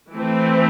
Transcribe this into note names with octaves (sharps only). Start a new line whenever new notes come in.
E3 A3 C4